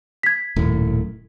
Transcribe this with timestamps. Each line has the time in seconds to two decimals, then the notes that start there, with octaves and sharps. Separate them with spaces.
0.23 G#6 B6
0.56 D#1 F#2 A2